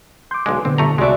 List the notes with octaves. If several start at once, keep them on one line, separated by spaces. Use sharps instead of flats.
C6 D6 G6
B1 D3 G#3
A#2 D3 B3 C4
G1 A3 A#5
C2 G#3 A3 F#4 D5 E5